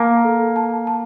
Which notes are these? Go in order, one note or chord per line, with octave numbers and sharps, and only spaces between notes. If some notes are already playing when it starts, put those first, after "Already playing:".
Already playing: A#3 A5
A4
A5
A5